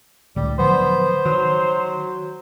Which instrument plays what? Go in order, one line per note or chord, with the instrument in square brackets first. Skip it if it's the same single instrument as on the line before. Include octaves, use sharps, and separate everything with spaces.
[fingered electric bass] C#2 A2 D3 [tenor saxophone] G3
[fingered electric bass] D3 F3 F#3 [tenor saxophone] B3 [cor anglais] C5
[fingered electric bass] D#3 [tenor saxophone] F#3